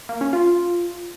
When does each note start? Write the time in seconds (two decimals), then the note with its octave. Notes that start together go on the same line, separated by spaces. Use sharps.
0.09 A#3
0.21 C#4
0.33 F4